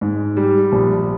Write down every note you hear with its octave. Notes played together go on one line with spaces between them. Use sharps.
G#2
G3
A#1